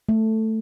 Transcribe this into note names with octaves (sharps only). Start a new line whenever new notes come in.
A3